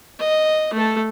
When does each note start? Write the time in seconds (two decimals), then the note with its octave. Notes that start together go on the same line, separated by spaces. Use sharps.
0.20 D#5
0.74 A3 A4